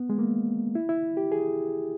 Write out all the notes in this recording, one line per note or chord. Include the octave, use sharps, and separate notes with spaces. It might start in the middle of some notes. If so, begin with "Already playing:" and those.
Already playing: B3
G#3
A#3
E4
E4
G4
G#4